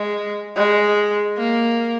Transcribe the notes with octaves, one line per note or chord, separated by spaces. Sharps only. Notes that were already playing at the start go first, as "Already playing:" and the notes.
Already playing: G#3
G#3
A#3